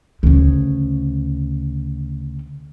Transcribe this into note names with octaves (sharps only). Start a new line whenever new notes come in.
D2 C#3